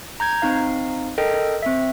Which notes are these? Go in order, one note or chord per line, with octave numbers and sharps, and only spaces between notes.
A#5 G6 G#6
C4 D#4 F5
A4 A#4 D#5 G5
C4 E5